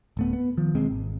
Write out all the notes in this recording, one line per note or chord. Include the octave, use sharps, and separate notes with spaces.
D1 A3 B3
B3
D#3 F3
E1 D#2 G#3 C4
G#1